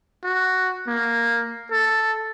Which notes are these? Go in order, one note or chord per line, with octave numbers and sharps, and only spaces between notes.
F#4
A#3
A4